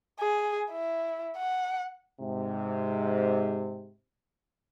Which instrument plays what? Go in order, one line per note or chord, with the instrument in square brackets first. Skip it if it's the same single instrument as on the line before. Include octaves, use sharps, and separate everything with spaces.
[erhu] G#4
E4
F#5
[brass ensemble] G#2 C3